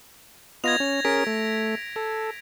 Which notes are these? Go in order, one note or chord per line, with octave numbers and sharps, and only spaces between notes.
B3 F4 D#5 G#6 A#6 F7
C#4
C#4 G#4 A#4 B6 D7
A3
A4